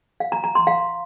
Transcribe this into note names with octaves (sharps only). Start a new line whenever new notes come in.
F5
A#5
A#5
C6
F5